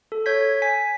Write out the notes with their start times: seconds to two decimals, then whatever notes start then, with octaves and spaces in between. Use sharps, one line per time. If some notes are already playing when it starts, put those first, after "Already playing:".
0.12 A4
0.26 C#5 G6 G#6 B6
0.62 G#5 B6